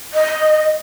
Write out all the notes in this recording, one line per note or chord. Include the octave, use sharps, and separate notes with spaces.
D#5